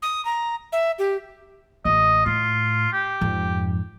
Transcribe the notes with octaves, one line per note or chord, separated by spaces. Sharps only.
D#6
A#5
E5
G4
A1 D#5
A2 F4
G4
F2 G#2